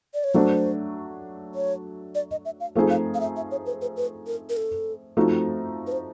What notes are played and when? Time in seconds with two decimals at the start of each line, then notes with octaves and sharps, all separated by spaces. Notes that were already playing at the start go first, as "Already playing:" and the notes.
0.14 D5
0.24 C#5
0.34 F#3 A3 D4 C5
1.55 C#5
2.15 D5
2.31 D#5
2.45 E5
2.60 F5
2.75 F3 A3 C4 D#4 G#4
2.90 F5
3.14 F5
3.21 E5
3.36 E5
3.51 C#5
3.66 B4
3.82 B4
3.97 B4
4.27 A#4
4.49 A#4
4.57 A4
5.17 F3 A3 C4 D#4 F#4
5.87 B4
5.92 C5